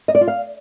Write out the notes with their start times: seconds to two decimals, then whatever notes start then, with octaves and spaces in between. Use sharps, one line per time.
0.08 D#5
0.15 D5
0.21 F4
0.28 F5